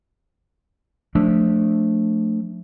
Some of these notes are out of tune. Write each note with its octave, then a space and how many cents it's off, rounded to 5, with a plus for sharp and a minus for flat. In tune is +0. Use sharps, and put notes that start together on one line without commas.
F3 +25 A3 +0 D4 +0